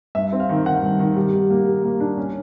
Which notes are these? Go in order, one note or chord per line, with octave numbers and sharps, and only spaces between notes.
G2 E5
C4
F5
D#3
D#3 F#5
G2
D#3
G3
G3
A#3
G3
A#3
D4
C#4